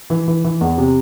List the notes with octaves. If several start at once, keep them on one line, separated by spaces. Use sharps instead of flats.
E3
E3
E3
E2
C3